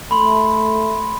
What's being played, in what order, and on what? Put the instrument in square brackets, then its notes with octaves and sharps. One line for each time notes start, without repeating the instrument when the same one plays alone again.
[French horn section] A3 [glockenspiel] B5 C6